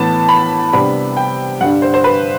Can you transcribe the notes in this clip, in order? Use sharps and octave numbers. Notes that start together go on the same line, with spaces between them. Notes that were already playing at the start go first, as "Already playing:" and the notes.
Already playing: A2 E3 B3 A5
B5
C3 G3 B3 D4 B5
G5
G2 D3 G3 D4 F#5
C5
C5
B4